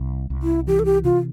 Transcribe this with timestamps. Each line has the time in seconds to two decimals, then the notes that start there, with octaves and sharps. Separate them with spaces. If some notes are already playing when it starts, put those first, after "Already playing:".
Already playing: C2
0.30 C2
0.43 E4
0.67 E3 G4
0.79 A4
0.85 G4
1.04 C3 F4